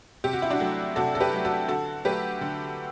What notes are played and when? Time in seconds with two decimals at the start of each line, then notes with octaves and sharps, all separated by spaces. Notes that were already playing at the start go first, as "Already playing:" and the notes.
0.24 C3 G4
0.33 F#4
0.42 E4
0.50 D4 F#4
0.60 F#3 A3
0.96 C3 F#4 A4
1.15 A4
1.20 G4 B4
1.33 F#3 A3
1.45 F#4 A4
1.68 D3 F#4 A4
2.05 F#3 A3 G4 B4
2.41 D3